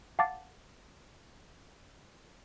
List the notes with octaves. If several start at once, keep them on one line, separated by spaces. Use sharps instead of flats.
F5 F#5 A5 D6 A6